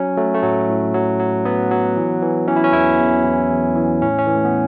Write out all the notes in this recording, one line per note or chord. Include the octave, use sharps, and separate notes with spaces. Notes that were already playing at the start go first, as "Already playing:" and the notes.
Already playing: F#3 C#4
F#3 A3
A3
A2 F#3
A2
F#3
F#3
F#3 B3
F#3
E3
E3
E3 C#4
E4
C#4
E2 E4
E2
E3
E2
E3
A2 C#4
C#4
E3
A3
B3